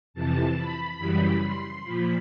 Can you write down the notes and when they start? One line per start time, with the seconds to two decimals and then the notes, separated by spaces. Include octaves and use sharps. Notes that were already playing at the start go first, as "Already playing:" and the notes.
0.14 F2 C3 E3 A5
0.57 B5
0.98 F#2 C#3 E3 G3
1.41 C6
1.83 A#2 F3 B5